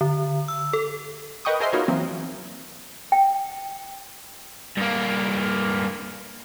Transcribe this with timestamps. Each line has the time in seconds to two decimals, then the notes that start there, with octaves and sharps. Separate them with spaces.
0.01 D3
0.48 E6
0.73 A4
1.45 A#4 B4 D#5 G5 C#6 D#6
1.60 G#4 A#4 C5 D#5 E5 C6
1.72 B3 D#4 F4 F#4 A#4 C#5
1.88 E3 F#3 A#3 C4
3.12 G5
4.77 G2 A#3